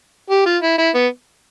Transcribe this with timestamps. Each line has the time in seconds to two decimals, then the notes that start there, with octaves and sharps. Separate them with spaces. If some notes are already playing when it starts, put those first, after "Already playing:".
0.30 G4
0.46 F4
0.63 E4
0.78 E4
0.95 B3